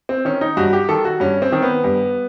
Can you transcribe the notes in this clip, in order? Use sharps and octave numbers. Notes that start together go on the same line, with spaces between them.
C4
D#3 C#4
D#4
G2 F#4
G4
D#3 A4
F#4
G2 C#4
C4
D#3
B3
G2